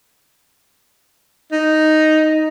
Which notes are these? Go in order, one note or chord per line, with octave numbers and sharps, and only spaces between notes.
D#4